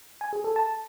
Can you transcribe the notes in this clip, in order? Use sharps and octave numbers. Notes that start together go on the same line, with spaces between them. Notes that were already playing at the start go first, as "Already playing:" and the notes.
G#5
G#4
A4
A5